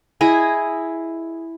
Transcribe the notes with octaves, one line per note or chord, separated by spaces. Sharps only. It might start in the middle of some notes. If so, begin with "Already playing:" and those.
E4 G#4 D#5